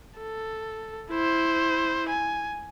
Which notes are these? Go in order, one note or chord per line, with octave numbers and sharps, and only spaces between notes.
A4
E4 C5
G#5